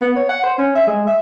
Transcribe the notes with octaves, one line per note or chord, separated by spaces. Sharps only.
B3
C#5
F#5
C5
C#4
E5
G#3
E5